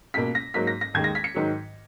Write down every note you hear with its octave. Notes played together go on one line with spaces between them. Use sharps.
C#2 B2 A#3 B6
A#6
G#2 F#3 A#3 B6
A#6
A#6
D#2 D#3 G#3 G#6
A#6
B6
C#7
G#2 D#3 F#3